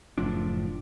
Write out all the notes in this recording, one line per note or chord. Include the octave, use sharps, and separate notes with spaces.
F#1 A2 F3 D4